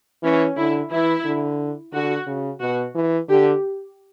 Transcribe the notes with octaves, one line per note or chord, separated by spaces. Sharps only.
E3 C#4
D3 E4
E3 E4
D3
D3 F#4
C#3
B2 F#4
E3
D3 G4